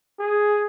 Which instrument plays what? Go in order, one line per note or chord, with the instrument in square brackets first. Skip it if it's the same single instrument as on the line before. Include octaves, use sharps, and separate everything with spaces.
[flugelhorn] G#4